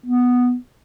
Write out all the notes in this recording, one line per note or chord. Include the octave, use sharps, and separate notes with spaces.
B3